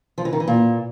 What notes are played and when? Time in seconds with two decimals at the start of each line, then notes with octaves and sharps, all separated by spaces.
0.18 F3
0.25 E3
0.33 D#3
0.40 E3
0.48 A#2